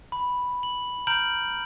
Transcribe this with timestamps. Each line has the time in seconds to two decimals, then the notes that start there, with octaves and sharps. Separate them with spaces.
0.12 B5
0.63 F#7
1.07 A#5 F6 G6 D7 F#7